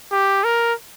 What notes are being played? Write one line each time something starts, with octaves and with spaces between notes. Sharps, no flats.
G4
A#4